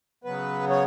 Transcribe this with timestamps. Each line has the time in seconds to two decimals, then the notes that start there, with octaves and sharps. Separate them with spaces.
0.24 C#3 F#3 B3 B4
0.70 C#5